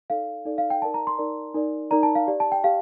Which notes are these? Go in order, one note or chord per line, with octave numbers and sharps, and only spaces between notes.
D#4 A4 D5 F5
D#4 A4 D5
F5
G5
D#4 A#4 D5 A5
A#5
C6
D#4 A#4 D5
D#4 A#4 D5
D#4 A#4 D5 A#5
A5
F5
G4 D5
A5
G5
G4 F5